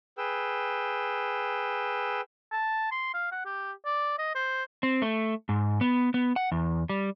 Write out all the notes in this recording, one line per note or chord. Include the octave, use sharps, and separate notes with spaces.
G#4 B4 G5 E6
A5
C6
F5
F#5
G4
D5
D#5
C5
C4
A3
G#2
B3
B3
F#5
E2
G3